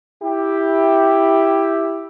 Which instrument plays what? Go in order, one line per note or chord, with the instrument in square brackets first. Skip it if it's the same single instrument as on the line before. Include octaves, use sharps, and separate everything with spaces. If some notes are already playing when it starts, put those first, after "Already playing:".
[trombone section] E4 G4